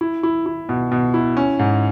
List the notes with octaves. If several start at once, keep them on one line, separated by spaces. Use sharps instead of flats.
E4
E4
E4
B2
B2
E4
C#4
G#2